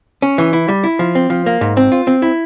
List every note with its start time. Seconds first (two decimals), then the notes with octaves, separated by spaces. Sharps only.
0.22 C#4
0.38 E3
0.53 E4
0.69 G3
0.84 E4
0.99 F3
1.15 C4
1.30 F3
1.46 A#3
1.61 G#2
1.77 C4
1.92 F4
2.07 C4
2.22 E4